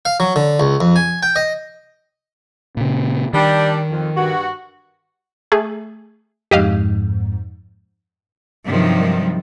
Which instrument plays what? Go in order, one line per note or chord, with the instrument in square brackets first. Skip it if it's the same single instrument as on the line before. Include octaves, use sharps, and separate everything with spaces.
[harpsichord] F5
F#3
D3
C#2
F2
G#5
G5
D#5
[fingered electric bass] A#2 C#3
[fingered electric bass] D#3 [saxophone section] G3 D4
[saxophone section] F2
G2 F#4
[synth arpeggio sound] A3 G#4
[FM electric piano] F2 G#2 [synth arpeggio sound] G4 D#5 F5
[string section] G2 C3 D#3 F3 F#3